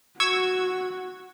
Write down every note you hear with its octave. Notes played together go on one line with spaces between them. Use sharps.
F#4 C#6 E6 G#6